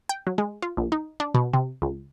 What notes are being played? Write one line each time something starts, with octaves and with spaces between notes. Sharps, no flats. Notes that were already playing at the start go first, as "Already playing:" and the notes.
G5
F#3
G#3
F4
A#1
D#4
D4
B2
C3
C#2